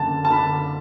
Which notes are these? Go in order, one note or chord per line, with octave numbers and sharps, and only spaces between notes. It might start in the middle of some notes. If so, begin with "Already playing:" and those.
Already playing: F#1 D3 A5
A5
D3 B5